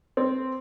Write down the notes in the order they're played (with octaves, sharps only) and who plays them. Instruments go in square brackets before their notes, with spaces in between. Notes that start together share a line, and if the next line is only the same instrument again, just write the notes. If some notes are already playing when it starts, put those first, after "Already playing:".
[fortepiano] C4